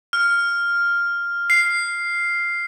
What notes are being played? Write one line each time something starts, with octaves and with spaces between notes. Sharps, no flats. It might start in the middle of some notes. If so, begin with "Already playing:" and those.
F6
C7